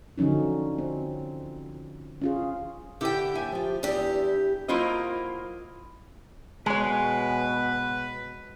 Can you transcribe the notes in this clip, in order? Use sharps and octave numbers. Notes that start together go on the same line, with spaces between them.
D3 F3 F#3 C#4 D#4
C4
C#4 F4 G#4
D3 E4 G4 A4 G5
D#2 E5 G#5
F3 F4
E2 G#2 D4 E4 G4
F#3 A#3 E4 F4 C5 D#5
B2 G#3 B4 C#5 G#5